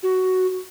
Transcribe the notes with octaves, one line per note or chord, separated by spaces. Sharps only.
F#4